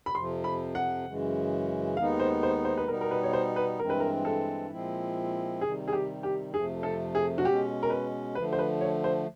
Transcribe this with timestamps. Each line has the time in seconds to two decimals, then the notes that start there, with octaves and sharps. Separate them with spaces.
0.06 B5
0.15 F2 C3 F3 C6
0.44 B5
0.75 F#5
1.06 F#2 C#3 E3 G#3
1.97 D#2 D#3 G#3 B3 D#4 F5
2.20 C5
2.43 C5
2.65 C5
2.77 B4
2.88 B2 G3 B3 D#4 A#4
3.01 A#4
3.11 B4
3.23 C#5
3.33 C5
3.56 B4
3.79 G2 E3 G#3 C4 A#4
3.90 B4
4.00 A#4
4.25 A4
4.70 A#2 F3 G#3 C4 E4
5.61 C3 D#3 G3 G#4
5.88 G#4
5.93 G4
6.23 G4
6.54 F2 C3 F3 A3 G#4
6.83 A4
7.15 G#4
7.38 F#4
7.44 B2 G#3 C#4 G4
7.83 A#4
7.90 B4
8.35 D3 F3 A3 B4
8.53 C5
8.59 B4
8.81 C#5
9.04 C5